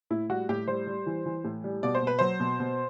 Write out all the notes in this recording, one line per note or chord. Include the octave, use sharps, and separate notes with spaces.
A2 E4
G3 F#4
A2 G4
G3 C5
G3
E3
E3
A2
G3
B2 D5
C5
B2
B4
F#3 C5
B2
B2